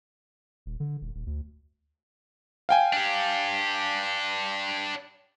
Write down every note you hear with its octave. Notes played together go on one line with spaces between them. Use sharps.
D#1
D3
D#1
D#1
D2
F5 G5 G#5
D4 G4